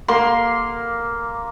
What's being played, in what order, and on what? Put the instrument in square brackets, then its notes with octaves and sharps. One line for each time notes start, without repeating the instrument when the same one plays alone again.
[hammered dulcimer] A#3 C6